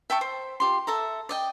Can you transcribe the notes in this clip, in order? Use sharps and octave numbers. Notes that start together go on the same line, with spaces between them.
E5 G5 A5 C#6
C5
F4 G4 C6
A4 E5 A#5
D5 D#5 G5